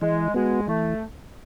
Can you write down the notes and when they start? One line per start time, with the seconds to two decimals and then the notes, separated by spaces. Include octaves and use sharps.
0.01 E3 G#3
0.34 G#3 B3 F#4
0.68 E3 A3